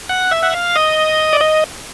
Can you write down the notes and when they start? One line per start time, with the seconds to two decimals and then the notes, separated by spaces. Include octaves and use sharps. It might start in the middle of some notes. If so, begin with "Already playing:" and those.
0.09 F#5
0.31 E5
0.43 F#5
0.54 F5
0.76 D#5
1.33 D5
1.41 D#5